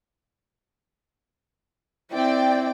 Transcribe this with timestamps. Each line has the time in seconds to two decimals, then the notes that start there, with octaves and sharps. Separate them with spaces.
2.13 C4 E4 D5 G5